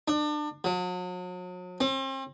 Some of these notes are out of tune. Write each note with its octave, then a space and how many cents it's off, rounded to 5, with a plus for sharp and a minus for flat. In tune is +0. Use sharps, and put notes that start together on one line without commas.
D4 +30
F#3 -40
C4 +40